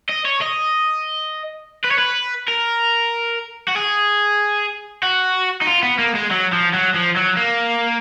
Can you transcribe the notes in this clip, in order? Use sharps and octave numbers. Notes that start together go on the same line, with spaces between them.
D#5
C#5
D#5
B4
C#5
B4
A#4
F#4
G#4
F#4
D#4
F4
B3
A#3
G#3
F#3
F3
F#3
F3
F#3
A#3